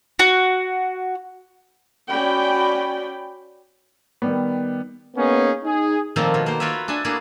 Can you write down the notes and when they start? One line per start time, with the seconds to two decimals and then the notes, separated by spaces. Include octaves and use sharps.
0.19 F#4
2.10 C#4 F#4 D5 G5 B5
4.22 D#3 G3 B3
5.16 A#3 B3 C#4 D#4 G#4
5.64 D#4 G#4
6.16 A#2 D#3 F3 A3 A#3 C4
6.34 B2
6.46 A#3 C5
6.60 F4 A#4 B4 C#5 E5
6.88 D4 A4 E5 G#5
7.04 A3 A#3 D4 E4 F#4 G#4